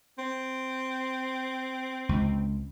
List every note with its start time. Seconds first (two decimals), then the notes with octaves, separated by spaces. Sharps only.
0.18 C4
2.09 C#2